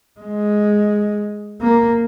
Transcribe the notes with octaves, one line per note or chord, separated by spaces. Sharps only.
G#3
A#3